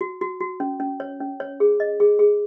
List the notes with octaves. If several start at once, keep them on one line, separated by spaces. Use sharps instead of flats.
F#4
F#4
F#4
C#4
C#4
C#5
C#4
C#5
G#4
D#5
G#4
G#4